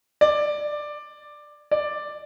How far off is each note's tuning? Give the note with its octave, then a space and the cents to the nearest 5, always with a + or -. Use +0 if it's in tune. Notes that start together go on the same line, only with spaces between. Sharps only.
D5 +10
D5 +5